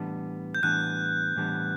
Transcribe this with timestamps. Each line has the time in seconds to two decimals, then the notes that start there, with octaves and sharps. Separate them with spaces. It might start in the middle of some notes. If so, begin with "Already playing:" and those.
Already playing: A2 E3 G3 B3 D4
0.55 G6
0.63 A2 E3 G3 B3 D4 F#6
1.36 A2 E3 G3 B3 D4